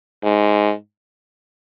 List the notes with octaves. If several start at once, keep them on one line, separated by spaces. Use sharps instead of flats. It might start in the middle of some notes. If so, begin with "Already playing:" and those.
G#2